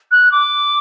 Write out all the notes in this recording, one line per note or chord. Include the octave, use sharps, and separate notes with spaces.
F#6
D6